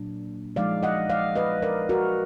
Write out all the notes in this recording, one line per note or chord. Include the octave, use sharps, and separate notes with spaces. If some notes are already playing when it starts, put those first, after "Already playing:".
Already playing: A#2 F#3 A#3 D4
F3 G#3 D#4 D5 F5
D#5 F#5
D5 F5
B4 D#5
A#4 D5
F#4 A#4